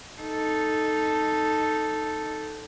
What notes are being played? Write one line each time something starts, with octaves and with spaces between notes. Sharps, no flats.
D#4 A4